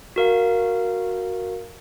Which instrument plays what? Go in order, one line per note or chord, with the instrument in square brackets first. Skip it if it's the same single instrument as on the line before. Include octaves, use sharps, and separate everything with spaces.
[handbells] F#4 A#4 F5